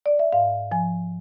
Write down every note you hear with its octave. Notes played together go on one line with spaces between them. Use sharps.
D5
E5
G#2 F5
F3 G#5